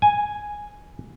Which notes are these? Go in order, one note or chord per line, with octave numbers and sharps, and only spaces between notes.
G#5